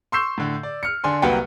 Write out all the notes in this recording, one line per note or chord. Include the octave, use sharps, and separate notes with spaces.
C6 C#6 E6 G6 C7 E7
A2 D3
D5
F6 C#7
D3 D4 G#5 C6
C2 F#3 A#3 B4 F#5 G5